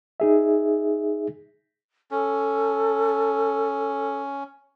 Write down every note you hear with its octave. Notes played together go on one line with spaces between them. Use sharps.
D#4 G#4 E5
C#4 A4